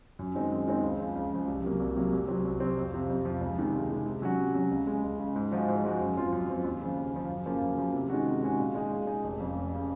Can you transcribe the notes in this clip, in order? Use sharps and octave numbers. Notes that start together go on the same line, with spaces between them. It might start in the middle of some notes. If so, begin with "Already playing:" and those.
F#2
D#3 G#3 C4 D#4
F#2
D#3 G#3 C4 D#4
C#2
C#3 F3
C#2
C#3 F3
C2
C3 F#3 A#3
C2
C3 F#3 A#3
C2
C3 F#3 C4
C2
C3 F#3 C4
F2
C3 F3
F2
C3 F3
C#2
C3 D#3 G#3
C#2
C3 D#3 G#3
C3
F#3 C#4 F#4
C3
F#3 C#4 F#4
C#2
C#3 G#3
C#2
C#3 G#3
G#2
F3 G#3 D#4 F#4
G#2
F3 G#3 D#4 F#4
F#2
F3 C4 F4
F#2
F3 C4 F4
D#2
C#3 F3
D#2
C#3 F3
F#2
C#3 F3 A#3
F#2
C#3 F3 A#3
C3
D#3 G#3 C#4 F#4
C3
D#3 G#3 C#4 F#4
A#2
G#3 D#4 G#4
A#2
G#3 D#4 G#4
F1
F2 C#3
F1
C#3